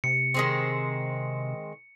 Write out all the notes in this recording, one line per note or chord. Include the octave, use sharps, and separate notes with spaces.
C3 C#7
D#3 G#3 C4